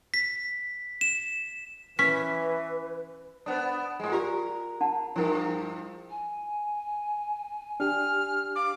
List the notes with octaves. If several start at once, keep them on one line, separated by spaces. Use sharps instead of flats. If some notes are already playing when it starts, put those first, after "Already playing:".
B6
E7
E3 C#4 B4 B6
B3 D4 C5 D#6
A2 G#3
F4 G4 A#4 D5
D4 F#5 A5
G2 F3 D4 E4 A#4
G#5
D4 G4 F6
F5 D6